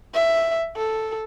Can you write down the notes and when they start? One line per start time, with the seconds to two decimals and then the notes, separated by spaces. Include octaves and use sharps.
0.14 E5
0.76 A4